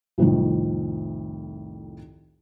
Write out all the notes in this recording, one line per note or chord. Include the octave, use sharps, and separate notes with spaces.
C2 F2 A2 D#3